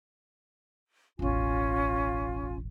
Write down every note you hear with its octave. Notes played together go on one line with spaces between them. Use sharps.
E1 A1 C#4 F4 G#5